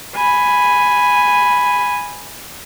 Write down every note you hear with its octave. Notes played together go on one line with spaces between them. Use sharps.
G#5 B5